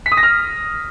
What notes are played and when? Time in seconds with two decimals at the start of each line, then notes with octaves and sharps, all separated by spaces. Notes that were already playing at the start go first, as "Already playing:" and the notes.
0.06 B6
0.12 D#6
0.17 A#6
0.23 F6